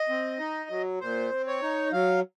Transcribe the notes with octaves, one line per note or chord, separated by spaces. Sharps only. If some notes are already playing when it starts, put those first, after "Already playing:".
Already playing: D#5
C4
D#4
F#3
A#2 C5
C4
C#5
D#4
F#3 F5